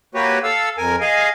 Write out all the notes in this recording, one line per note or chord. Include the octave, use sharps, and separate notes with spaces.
A#3 F#4 G4 B4 C#5
A4 F5 E6
F2 A#4 G#5
G#4 D#5 F5 G#5